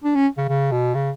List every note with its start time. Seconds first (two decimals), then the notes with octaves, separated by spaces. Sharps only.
0.04 D4
0.15 C#4
0.38 C#3
0.49 C#3
0.72 B2
0.95 C#3